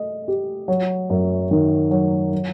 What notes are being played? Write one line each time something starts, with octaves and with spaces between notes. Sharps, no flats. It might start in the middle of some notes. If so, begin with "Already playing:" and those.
Already playing: A3 D#5
G4
F#3
F#2
D#3
F#3
F#3